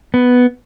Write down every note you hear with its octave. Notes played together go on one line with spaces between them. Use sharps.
B3